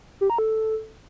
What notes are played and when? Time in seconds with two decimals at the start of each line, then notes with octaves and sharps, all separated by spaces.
0.21 G4
0.30 A#5
0.38 A4